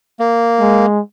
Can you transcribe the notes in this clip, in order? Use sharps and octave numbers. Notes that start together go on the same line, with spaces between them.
A#3
G#3